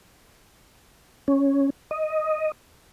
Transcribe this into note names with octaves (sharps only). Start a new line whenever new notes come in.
C#4
D#5